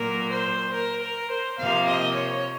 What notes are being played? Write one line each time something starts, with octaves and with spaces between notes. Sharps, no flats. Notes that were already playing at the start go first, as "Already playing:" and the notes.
Already playing: A#2 F#3 A#3 A#4
C5
A#4
A#4
C5
C3 F3 A#3 F5
D#5
C#5